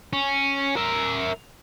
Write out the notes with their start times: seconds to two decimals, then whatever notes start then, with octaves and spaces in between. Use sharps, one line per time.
0.13 C#4
0.76 A#4 E5